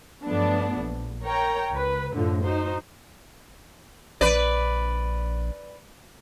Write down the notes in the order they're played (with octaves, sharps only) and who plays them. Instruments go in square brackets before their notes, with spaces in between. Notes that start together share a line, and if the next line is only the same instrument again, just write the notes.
[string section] G2 F3 F#3 A3 B3 D4
A#1
A#4 C#5 G5 A#5
C#2 B4
F#2 A2 D3 F3
D#4 F#4 C5
[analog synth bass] A#1 [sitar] B4 D5